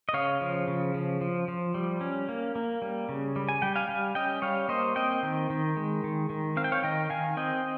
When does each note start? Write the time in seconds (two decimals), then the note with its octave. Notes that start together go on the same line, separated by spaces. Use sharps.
0.09 D#5
0.13 C#3 C#5 F5
0.41 F3
0.68 C#3
0.94 F3
1.21 F3
1.48 F3
1.74 G3
2.01 C#4
2.29 A#3
2.56 A#3
2.82 G3
3.09 C#3
3.36 G3
3.49 G#5
3.62 G3 G5
3.76 F5 G#5
3.89 G3
4.15 C#4 D#5 G5
4.42 G3 C#5 F5
4.68 A#3 C5 D#5
4.96 C4 D#5 G5
5.23 D#3
5.50 D#3
5.77 G#3
6.04 D#3
6.30 D#3
6.57 C4 F5
6.64 G5
6.72 C#5 F5
6.83 D#3 D#5 G5
7.10 D#3 F5 G#5
7.37 C4 D#5 G5